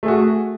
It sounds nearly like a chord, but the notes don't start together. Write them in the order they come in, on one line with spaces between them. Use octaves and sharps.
A3 G#4 F#4